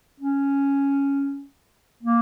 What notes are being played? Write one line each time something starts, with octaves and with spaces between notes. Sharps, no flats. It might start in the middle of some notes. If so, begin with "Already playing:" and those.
C#4
A#3